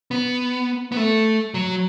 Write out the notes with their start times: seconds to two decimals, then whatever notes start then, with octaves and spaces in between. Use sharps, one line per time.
0.11 B3
0.92 B3
0.97 A3
1.54 F#3